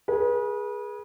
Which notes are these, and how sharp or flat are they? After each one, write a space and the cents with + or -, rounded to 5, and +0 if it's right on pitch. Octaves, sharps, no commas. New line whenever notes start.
G#4 +0 B4 -35